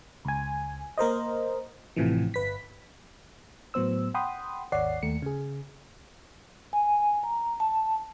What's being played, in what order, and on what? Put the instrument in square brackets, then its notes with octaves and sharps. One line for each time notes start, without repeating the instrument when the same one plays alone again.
[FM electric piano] C#2 G#5
A#3 A#4 C5 D#5
A1 A2 C3 E3 F3
G1 B4 B6
A2 F#3 B3 C5 E6
F#5 G5 B5 C6 D#6
G#1 D#2 C#5 D5 F#5 C7
D#2 A3 C#7
C#3 G#4
[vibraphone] G#5
A#5
A5